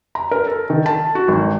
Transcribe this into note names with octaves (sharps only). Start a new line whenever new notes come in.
A#5
A#4
A4
D#3
A5
F#4
G#1